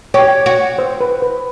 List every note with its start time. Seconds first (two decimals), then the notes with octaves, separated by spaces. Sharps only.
0.14 G4 C#5
0.46 F#4
0.79 C5
1.01 B4
1.22 B4